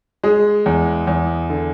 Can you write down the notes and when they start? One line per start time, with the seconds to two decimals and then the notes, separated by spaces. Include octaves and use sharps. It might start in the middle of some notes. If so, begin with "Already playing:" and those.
0.23 G#3 G#4
0.66 E2
1.07 E2
1.50 D3